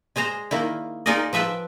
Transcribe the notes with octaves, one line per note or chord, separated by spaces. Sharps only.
G#3 G#4 C5 A#5
D#3 A#3 E4
D#4 F4 G#4 A#4 D5 D#5
F3 B4 E5 G5 A5